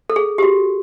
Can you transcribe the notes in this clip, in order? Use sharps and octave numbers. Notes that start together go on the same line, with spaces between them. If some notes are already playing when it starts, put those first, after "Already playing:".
A4
G#4
G4
F#4